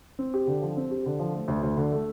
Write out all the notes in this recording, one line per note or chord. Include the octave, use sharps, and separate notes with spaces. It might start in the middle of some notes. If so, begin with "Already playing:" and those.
C4
G4
D3
F3
C4
G4
D3
F3
A3
D2
D2
D3
A3